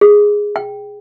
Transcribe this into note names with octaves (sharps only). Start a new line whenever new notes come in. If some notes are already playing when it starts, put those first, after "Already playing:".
G#4
G5